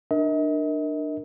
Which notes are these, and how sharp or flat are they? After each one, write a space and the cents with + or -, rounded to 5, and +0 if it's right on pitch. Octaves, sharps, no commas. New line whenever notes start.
D4 +25 A#4 +0 D#5 +40